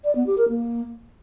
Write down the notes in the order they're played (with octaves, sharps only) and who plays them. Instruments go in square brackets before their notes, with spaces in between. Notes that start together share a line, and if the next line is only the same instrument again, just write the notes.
[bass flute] D5
B3
G4
A#4
A#3